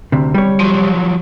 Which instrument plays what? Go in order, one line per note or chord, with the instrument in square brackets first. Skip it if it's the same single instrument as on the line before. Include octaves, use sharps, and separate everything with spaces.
[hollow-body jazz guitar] D2 C3
G3 C#5
[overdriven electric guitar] F3 F#3